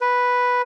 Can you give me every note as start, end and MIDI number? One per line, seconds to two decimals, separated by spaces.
0.01 0.62 71